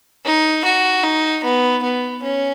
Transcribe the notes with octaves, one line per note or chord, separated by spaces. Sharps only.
D#4
F#4
D#4
B3
B3
C#4